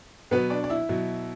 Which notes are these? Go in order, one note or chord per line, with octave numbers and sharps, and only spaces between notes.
B2 F#3 B3 B4
D4 D5
D5
E4 E5
B2 F#3